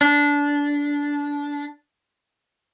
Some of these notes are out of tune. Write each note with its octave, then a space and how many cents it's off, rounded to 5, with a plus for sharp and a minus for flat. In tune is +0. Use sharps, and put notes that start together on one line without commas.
D4 -20